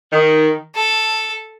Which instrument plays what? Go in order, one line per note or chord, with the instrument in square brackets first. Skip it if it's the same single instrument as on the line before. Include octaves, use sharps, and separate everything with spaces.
[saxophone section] D#3
[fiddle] A4